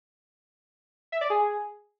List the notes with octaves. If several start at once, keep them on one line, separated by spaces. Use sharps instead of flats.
E5
D5
G#4